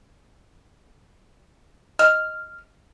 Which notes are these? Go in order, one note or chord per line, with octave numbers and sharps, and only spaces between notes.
D#5 F6